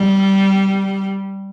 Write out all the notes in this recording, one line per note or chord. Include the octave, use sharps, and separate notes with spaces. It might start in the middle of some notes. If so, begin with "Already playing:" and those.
Already playing: G3